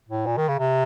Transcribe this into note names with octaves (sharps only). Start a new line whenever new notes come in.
A2
A#2
D#3
C#3
C3